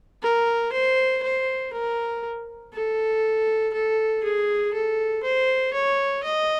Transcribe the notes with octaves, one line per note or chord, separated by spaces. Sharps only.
A#4
C5
C5
A#4
A4
A4
G#4
A4
C5
C#5
D#5